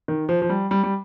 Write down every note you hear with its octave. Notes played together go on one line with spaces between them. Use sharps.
D#3
F3
F3
G3
G3
G3